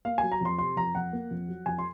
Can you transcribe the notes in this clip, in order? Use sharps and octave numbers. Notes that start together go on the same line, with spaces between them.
A#3 F5
F#3 G#5
A#5
F2 C6
C3 C6
F2 A#5
F2 F#5
A#3
F2
F#3
F2 G#5
C6